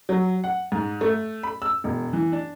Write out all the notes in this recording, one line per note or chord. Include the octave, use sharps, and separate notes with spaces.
F#3
F#5
G#2
A3
B5
E6
E1
E3
D4